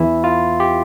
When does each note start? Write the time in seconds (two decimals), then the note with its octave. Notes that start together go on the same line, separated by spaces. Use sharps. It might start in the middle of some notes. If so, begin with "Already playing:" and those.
Already playing: E2 E3 E4
0.24 F4
0.60 G4